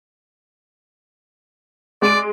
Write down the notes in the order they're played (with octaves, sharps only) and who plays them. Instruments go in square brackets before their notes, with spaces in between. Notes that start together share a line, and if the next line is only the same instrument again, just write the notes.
[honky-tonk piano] G#3 D7 [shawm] D5